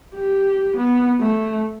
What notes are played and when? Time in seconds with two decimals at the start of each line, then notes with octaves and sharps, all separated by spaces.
0.15 G4
0.77 B3
1.21 A3